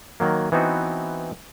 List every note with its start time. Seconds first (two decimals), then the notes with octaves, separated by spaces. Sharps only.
0.20 D#3 F#3 A#3
0.52 E3 B3 C4 D#4 F#4